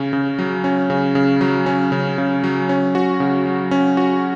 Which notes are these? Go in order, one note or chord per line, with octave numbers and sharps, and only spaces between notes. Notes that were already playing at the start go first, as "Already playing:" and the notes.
Already playing: C#3 C#4
C#3
F#3
C#4
C#3
C#3
F#3
C#4
C#3
C#3
F#3
C#4
F#4
C#3
F#3
C#4
F#4